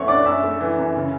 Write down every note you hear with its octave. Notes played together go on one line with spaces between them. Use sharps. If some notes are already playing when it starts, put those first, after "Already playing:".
Already playing: F#2 E3 A3 C#5 F#5 C#6
D4 D5 D6
F#2 E5 E6
A3
E3
F#2
C#3